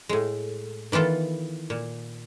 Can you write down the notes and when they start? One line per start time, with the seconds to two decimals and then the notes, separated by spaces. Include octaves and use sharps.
0.09 A2 G#3
0.92 D#3 E3 B3 F4 A4
1.70 A#2